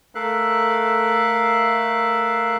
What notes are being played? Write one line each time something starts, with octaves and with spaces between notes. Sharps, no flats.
A3 A4 A#4 E5 F5 F#6